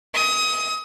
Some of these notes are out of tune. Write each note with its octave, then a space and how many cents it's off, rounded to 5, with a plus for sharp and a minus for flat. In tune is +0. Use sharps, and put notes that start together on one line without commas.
D#6 +30